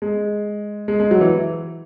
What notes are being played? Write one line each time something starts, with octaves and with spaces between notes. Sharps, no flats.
G#3
G#3
G#3
F#3
E3